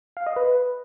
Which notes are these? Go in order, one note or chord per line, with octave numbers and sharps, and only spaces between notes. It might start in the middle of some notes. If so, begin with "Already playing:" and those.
F5
D#5
B4